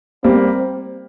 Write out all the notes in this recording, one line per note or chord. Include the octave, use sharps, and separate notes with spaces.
G3 A#3 C4